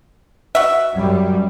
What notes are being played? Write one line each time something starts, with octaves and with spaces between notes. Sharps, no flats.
F#4 E5
F#2 G3